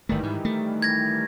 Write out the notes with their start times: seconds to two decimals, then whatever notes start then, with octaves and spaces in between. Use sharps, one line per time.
0.09 G1 D#3 E3 G3 A3
0.23 G#2
0.45 A3
0.82 G#6 A#6